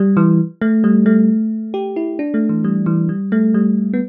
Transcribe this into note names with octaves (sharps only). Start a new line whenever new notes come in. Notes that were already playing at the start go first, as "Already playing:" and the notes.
Already playing: G3
E3
A3
G3
A3
G4
E4
D4
A3
E3
G3
E3
G3
A3
G3
B3